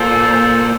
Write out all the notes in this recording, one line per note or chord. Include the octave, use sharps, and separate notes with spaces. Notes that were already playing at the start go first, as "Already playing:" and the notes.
Already playing: A#2 A4 C5
A4 C5